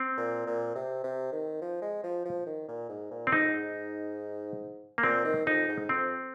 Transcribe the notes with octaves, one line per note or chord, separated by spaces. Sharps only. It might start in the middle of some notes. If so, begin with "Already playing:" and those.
Already playing: C4
A#2
A#2
C3
C3
D#3
F3
G#3
F3
F3
D#3
A#2
G#2
A#2
C4
G#2 D#4
F2
G#2
A#3
A#2 C4
D#3
F2 D#4
G#2
F2 C4